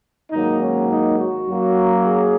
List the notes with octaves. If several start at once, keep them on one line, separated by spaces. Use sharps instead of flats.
G#2 D#3 F#3 A#3 D#4
C#4
D#4
F#4
F#2 F#3 A#3
G#4